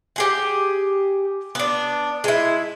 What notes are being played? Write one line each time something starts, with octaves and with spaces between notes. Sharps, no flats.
G4 G#4 F#5
B3 D4
G#3 E4